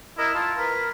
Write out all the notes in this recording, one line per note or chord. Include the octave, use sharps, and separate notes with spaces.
E4 A#4 D#5 A#5
F4 A5
A#4 B4